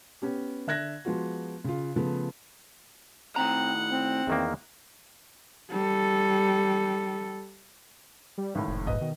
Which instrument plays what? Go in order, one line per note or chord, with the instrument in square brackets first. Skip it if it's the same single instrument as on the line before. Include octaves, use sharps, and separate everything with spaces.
[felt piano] B3 C#4 G4
D3 E5 F#6 G#6 A#6
F3 G#3 B3 F4 F#4
C#3 F4
C#3 F3 A3 B3
[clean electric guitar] A2 D#3 A#5 [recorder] C4 [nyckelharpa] F#5
[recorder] C4
[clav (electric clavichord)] E2 D#3 A#3
[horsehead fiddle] G3 A4
[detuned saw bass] G3
[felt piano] G#1 A2 [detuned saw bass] E3
[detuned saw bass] F1
[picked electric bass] A#1 G#2 [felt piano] B4 D#5
[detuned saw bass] B2 [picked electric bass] D#3